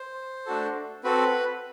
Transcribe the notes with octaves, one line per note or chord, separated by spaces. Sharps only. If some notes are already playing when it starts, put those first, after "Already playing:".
Already playing: C5
A3 D4 F#4 A4
C4 F#4 A4 B4